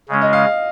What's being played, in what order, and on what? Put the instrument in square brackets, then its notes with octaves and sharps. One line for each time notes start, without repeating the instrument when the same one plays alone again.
[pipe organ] C#3 G#3 C#4
[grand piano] D#5
F5